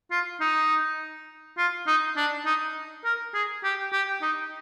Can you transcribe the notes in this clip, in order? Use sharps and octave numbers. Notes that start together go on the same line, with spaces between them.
F4
D#4
F4
D#4
D4
D#4
A#4
G#4
G4
G4
D#4